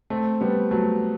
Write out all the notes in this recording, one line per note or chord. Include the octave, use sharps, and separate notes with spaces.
A3 C4
G3 B3
F#3 A3